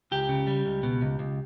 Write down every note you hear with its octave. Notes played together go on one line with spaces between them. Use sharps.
C#2 G4
C#3
G3
C#2
B2
C#2
C#2